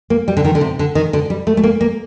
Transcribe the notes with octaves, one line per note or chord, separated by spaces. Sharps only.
A#3
G3
D3
D#3
D3
C3
D3
D#3
D3
G3
A3
A3
A#3
A#3